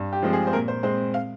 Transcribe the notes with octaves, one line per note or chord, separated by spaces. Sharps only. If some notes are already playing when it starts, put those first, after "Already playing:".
Already playing: G2
G4
F3 G#3 C4
G#4
C5
A#2 A#4
C5
G#3 C4 C5
F5